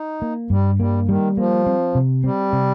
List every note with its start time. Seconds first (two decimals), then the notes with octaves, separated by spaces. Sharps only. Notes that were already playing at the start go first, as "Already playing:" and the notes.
Already playing: D#4
0.22 A#3
0.50 G2 G3
0.80 G3 A#3
1.08 D#3 G3
1.37 F3 A#3
1.66 C4
1.95 C3
2.24 G3 C4
2.53 C3